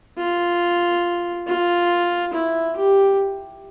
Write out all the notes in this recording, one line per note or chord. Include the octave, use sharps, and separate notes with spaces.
F4
F4
E4
G4